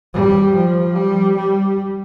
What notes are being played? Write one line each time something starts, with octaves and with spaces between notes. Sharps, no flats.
G3
F3
G3
G3